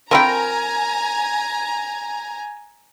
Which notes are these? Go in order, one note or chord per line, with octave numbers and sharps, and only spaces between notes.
F3 C4 A#4 G5 G#5 A#5 B5